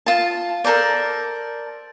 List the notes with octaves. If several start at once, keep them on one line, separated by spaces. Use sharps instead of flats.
F4 A5
A4 A#4 C5 D5